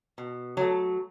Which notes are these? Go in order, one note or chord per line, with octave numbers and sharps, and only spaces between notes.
B2
F#3 A3